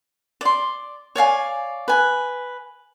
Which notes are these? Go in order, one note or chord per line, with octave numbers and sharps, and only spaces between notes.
D5 C6
C#5 D5 F5 G#5
B4 G#5